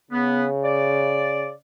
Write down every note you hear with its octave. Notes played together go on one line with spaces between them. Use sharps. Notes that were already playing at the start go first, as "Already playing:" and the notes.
C#3 B3
D5